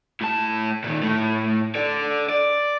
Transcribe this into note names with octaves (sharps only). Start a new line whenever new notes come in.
A2 A5
A#2 D#3
A2 A3
A4 D5
D5